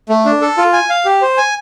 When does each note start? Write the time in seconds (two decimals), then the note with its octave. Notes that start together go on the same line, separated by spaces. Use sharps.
0.09 A3
0.25 D4
0.41 A4
0.58 F4
0.73 G#5
0.90 F5
1.05 G4
1.22 C5
1.37 G#5